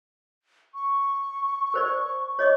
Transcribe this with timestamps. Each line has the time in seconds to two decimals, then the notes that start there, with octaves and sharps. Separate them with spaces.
0.74 C#6
1.74 A#4 C5 D5
2.39 C#5 D#5 D6